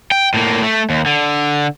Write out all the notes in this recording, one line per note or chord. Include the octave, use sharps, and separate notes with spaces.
G5
A2 A#3
A3
D#2
D3